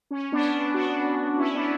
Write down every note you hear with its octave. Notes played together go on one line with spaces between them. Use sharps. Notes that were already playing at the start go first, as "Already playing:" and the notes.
C#4
B3 D4
D4 F#4
C#4 E4
B3 D4